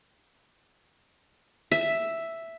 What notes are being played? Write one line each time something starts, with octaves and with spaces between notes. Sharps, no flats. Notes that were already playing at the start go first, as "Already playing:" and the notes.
E5